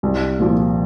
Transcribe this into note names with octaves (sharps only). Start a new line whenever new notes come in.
C2
A#2 F3